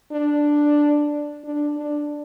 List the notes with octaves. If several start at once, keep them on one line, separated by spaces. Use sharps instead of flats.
D4
D4
D4